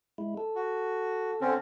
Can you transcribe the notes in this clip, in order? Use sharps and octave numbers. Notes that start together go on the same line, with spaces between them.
G#3 E4
A4
F#4
D3 C4 C#4